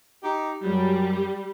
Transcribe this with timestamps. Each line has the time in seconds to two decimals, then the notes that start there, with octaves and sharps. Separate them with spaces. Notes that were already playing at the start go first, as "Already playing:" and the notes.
0.23 D#4 G4
0.65 F#2 F#3 G3